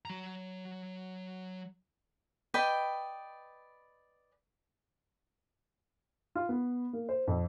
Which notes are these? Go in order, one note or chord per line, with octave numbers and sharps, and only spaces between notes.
F#3 A#5
B4 D5 D#5 G5
F4
B3
A#3
C5
F2